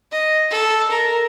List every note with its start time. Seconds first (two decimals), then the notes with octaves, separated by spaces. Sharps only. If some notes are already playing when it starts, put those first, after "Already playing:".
0.12 D#5
0.50 A4
0.90 A#4